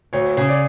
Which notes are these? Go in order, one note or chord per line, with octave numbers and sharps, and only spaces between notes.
D2 C#5
C#3
D5